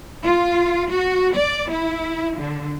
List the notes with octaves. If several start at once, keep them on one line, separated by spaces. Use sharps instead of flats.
F4
F#4
D5
E4
D3